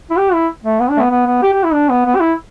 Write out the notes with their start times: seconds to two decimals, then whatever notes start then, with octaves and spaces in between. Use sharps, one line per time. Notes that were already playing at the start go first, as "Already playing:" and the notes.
0.11 E4
0.18 G4
0.33 E4
0.64 A3
0.80 B3
0.90 D4
0.97 A3
1.00 B3
1.11 B3
1.26 B3
1.43 G4
1.53 G4
1.64 E4
1.73 D4
1.90 B3
2.06 B3
2.16 G4
2.20 E4